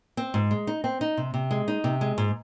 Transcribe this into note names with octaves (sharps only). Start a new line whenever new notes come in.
C4
G#2
G#3
D#4
C4
D#4
C3
C3
G#3
D#4
C3
G#3
G#2